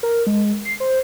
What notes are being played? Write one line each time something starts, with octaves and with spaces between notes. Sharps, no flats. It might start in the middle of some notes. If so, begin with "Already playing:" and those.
A#4
G#3
C7
C5